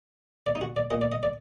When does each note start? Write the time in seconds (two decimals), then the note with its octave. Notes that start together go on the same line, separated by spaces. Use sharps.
0.46 D5
0.55 D#4
0.61 F#4
0.76 D5
0.90 A#2 D#5
1.01 D5
1.12 D#5
1.23 D5